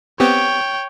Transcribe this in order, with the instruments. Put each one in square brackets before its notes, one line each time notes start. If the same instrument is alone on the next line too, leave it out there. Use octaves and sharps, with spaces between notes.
[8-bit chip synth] B3 C4 G4 [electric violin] C#5 G5